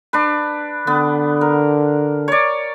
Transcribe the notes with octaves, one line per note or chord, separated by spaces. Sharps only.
D4 B4
D3 B3
A#4
C#5 D5